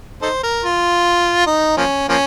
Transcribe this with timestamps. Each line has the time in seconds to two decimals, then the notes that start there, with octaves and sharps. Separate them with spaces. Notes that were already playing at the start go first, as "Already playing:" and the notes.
0.22 D#4 A4 C5
0.43 A#4
0.65 F4
1.47 D#4
1.77 F3 A#3 C#4
2.09 F3 A#3 C#4